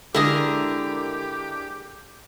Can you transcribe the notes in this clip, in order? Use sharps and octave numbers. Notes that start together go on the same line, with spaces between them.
D3 G#3 D4 E4 G4 A#4 D#6